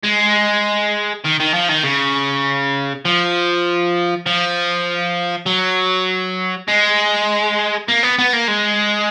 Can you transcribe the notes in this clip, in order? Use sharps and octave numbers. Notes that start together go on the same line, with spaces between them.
G#3
D#3
D#3
F3
D#3
C#3
F3
F3
F#3
G#3
A#3
B3
B3
A#3
G#3